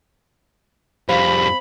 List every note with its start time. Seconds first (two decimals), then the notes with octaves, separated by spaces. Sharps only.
1.09 F2 G3 C5 F5 B5